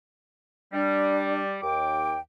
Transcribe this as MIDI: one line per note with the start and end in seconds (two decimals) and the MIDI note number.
0.73 1.56 55
0.73 1.42 62
1.62 2.14 39
1.62 2.20 79
1.62 2.14 86